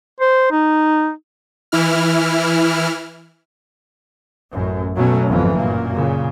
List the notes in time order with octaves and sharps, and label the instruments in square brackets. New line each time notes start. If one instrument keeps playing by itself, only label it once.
[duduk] C5
D#4
[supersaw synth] E3 E4 F6
[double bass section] A1 F#2
B2 F#3 A3 C#4
G1 F2 G#2 E3 F3
F#2 A#2 A#3
A#2 C#3